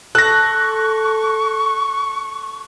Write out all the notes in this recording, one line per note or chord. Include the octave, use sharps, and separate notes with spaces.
A4 C#6 F#6 A#6